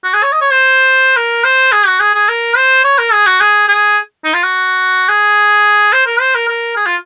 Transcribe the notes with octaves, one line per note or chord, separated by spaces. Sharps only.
F#4
G#4
C#5
D#5
C#5
C5
A#4
C5
G#4
F#4
G#4
G#4
A#4
C5
C#5
A#4
G#4
F#4
G#4
G#4
D#4
F4
F#4
G#4
C5
A#4
C5
A#4
A#4
G#4
F4